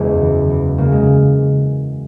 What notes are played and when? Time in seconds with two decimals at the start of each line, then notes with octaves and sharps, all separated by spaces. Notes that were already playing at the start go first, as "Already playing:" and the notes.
Already playing: F#1 E2 G#3
0.22 E3
0.49 E3
0.78 C#3 A#3
0.92 G#3